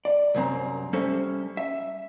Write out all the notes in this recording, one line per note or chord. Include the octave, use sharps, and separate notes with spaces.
D5
C2 F#2 C4 A#5
G3 C#4 A4 C5 E5
E5